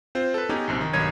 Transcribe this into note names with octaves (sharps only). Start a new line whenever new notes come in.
C4 F4 C5
A4 B4
B3 C#4 D#4 G4 G#4
A#1 F#2 C3
D#3
B1 G2 D#3 C#5 G#6 D#7